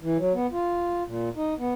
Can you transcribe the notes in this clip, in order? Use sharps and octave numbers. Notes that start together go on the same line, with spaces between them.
E3
F#3
B3
F4
A#2
D#4
B3